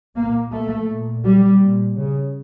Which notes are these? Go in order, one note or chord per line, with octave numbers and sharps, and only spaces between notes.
A#2 A#3
A3
A#2
G3
A#2
C#3